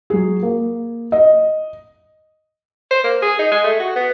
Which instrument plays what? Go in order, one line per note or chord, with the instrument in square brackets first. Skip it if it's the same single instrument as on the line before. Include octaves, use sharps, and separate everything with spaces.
[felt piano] F#3 G#4
A#3
D#5
[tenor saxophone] C5
A#3
G#4
D#4
G#3
A3
F#4
B3